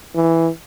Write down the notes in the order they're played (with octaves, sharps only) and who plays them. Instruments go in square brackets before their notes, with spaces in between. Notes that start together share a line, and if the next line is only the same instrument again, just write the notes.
[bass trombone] E3